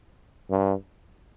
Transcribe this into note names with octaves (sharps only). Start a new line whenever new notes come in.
G2